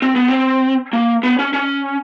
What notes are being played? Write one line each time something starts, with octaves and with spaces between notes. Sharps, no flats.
C4
B3
C4
A#3
B3
C#4
C#4